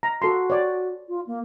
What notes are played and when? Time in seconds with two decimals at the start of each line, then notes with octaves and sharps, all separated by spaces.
0.03 A#5
0.22 F#4 A4 C6
0.50 C#5 D5
1.08 F4
1.27 A#3